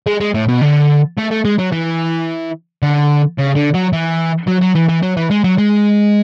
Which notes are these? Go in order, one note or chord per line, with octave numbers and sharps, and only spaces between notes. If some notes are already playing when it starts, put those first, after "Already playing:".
G#3
G#3
A2
B2
D3
A3
A3
G#3
F#3
E3
D3
C#3
D3
F#3
E3
F#3
F#3
E3
E3
F#3
E3
G#3
F#3
G#3